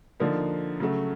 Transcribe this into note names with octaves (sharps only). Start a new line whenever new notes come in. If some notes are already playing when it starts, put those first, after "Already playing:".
D3 F3 A#3 D#4
C#3 F#3 A3